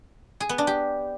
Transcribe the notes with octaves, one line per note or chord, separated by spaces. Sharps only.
G#4
B3
D4
G4